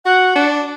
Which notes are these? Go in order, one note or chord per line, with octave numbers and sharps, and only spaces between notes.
F#4 F#5
D4